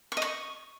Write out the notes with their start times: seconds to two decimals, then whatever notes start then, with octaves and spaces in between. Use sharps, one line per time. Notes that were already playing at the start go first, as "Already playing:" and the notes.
0.12 C#6
0.17 D#5
0.22 C#6